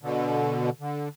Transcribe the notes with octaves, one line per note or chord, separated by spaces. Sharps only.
B2 D3
D3